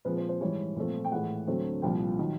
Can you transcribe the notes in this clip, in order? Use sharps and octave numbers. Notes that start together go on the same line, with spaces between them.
A#2 F3 G#3 C4 B4
C5
C5
G#2 E3 G3 C#5
A#2 F3 A3 C4
G5
A2 E3 G#3 F#5
D2 D3 F#3 A3 C4
C2 A#2 F3 G5
D#3 F#3